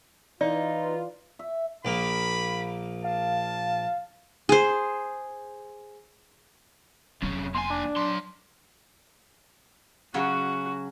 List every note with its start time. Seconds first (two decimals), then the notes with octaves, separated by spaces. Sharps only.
0.41 E3 D#4 F4 B4 D5
1.39 E5
1.85 A#1 A#3 B5
3.04 F5 A5
4.49 G#4 C5
7.22 F1 C3 F#3 C#4
7.54 D#2 G#5 C6
7.70 D4
7.96 F#3 C6
10.14 C#3 F#3 C#4 F#4